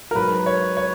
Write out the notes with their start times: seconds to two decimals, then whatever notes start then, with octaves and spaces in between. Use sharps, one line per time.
0.11 A#4
0.15 G#2 F#3 B4
0.46 C#5
0.77 C#5